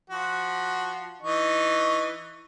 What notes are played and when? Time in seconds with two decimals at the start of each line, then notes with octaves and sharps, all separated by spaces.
0.10 F3 F#4
1.23 E3 D#4 C#6